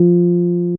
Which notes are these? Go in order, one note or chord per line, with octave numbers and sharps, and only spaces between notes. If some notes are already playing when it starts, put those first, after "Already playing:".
Already playing: F3